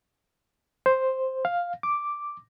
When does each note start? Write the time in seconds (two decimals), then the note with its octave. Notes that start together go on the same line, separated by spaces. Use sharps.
0.86 C5
1.45 F5
1.83 D6